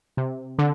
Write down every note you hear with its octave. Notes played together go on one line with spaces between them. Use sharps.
C3
D3